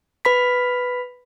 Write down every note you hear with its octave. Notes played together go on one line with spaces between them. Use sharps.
B4 B5 B6